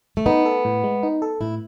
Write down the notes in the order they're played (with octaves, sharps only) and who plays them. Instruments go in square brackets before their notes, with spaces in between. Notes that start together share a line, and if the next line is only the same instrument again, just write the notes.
[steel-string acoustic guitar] A3
[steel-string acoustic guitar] B3 [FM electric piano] D#4
[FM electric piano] A4
A2
G#3
D#4
A4
[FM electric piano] A2 [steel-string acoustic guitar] E4